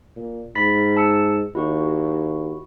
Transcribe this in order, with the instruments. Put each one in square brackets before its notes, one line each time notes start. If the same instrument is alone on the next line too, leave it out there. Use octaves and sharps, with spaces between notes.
[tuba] A#2
[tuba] G#2 [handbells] B5 A6 B6
[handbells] A5 E6 C#7
[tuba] D#2 [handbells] E4 F#4 C#6